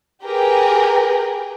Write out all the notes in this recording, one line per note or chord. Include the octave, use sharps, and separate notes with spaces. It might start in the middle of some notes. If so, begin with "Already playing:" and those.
G4 G#4 A#4 B4 G5